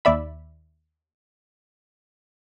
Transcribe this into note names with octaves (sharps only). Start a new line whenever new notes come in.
D#2 D5 E5 B5